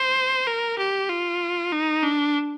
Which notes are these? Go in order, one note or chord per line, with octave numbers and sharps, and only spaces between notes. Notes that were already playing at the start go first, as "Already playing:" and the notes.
Already playing: C5
A#4
G4
F4
D#4
D4